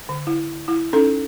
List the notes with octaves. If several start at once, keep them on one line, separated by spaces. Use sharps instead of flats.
D3
E4
E4
C#4 D#4 A4